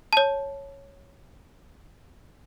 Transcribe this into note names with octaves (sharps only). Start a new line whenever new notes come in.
C#5 A5